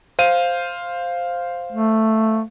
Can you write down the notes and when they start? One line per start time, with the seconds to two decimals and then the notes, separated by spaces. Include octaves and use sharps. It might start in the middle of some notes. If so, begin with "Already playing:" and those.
0.19 C5 F5 D#7
1.72 A3